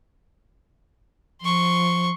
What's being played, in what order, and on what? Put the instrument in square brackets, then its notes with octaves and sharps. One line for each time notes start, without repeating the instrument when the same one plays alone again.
[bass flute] F3 [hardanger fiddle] C6 C#6